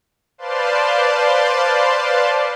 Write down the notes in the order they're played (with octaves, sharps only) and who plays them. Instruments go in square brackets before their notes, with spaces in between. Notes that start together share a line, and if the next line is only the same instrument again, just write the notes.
[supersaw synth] B4 C5 D5 F5 A5 C6